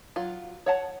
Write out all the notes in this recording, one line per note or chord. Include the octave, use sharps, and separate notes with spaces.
F#3 F4
C#5 F#5 A5